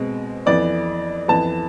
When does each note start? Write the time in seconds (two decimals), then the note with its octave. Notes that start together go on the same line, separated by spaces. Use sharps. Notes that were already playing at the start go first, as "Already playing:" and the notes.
Already playing: B2 G#3 C4
0.46 F2 E3 B3 D5
1.28 F2 E3 B3 A5